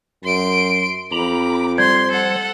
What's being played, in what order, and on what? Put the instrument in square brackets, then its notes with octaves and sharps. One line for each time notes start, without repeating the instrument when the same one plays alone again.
[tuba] F#2 [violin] C6 D7
[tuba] F2 [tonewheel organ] A#5 B5 [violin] D6
[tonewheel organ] G3 C5 [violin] C6 [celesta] G#6
[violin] A4 F#5